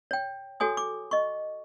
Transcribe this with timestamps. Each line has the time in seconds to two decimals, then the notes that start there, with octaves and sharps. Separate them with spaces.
0.11 C#5 G5
0.60 F#4 A4 C#5 G#5 D#6
0.77 D6
1.11 D#5 C#6